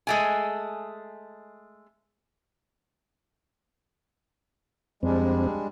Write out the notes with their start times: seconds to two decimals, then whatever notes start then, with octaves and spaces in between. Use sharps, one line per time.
0.07 G#3 A3 G#5
5.03 F2 G3 G#3 C4 D4